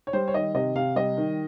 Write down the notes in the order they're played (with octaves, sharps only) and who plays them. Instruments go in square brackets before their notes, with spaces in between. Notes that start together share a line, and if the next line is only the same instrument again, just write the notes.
[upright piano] C#5
G3 C5
C#5
D#3 D#5
C3 D#5
C3 F5
G3 D#5
D#3